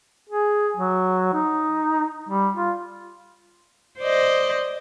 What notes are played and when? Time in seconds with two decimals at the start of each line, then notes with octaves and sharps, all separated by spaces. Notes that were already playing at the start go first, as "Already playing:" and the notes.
0.30 G#4
0.77 F#3
1.34 D#4
2.29 G3
2.56 F4
3.99 C5 D5 D#5